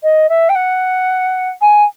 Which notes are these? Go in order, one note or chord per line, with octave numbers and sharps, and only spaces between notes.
D#5
E5
G5
F#5
G#5